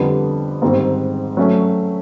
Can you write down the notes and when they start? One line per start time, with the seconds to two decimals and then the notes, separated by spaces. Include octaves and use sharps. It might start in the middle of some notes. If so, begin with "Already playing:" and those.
Already playing: F2 D3 G3 B3
0.62 G#2 D#3 G3 C4
1.37 F#3 A3 C#4